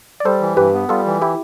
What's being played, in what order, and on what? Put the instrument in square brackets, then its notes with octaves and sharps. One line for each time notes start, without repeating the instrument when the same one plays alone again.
[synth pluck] D5
[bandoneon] G3 [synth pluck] A4 C5
[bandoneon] E3
[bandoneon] G2 [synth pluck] G4 B4
[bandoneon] B3
[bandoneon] G3 [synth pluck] F4 A4
[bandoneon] E3
[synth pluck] E4 G4